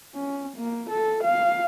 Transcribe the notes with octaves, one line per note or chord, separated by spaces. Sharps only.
C#4
A#3
A4
F5